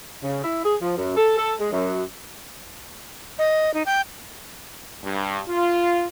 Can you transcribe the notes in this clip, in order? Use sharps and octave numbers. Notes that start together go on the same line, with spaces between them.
C#3
E4
G#4
F3
F#2
A4
A4
G#3
F#2
D#5
D#4
G5
G2
F4